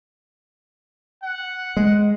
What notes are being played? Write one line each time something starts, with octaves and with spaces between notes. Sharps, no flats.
F#5
G#3